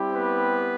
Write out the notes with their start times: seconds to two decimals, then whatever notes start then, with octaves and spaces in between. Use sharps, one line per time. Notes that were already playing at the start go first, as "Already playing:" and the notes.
Already playing: G3 C4 E4 G4
0.12 B3 B4